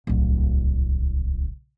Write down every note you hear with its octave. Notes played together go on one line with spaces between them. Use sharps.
D1 C2